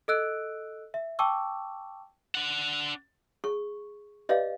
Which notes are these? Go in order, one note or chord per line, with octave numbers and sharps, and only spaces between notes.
A4 D#5 E6 F#6 D7
E5
G5 A5 C#6 D6 E6
D4 F#5
G#4 C#6
G4 B4 D5 D#5 F5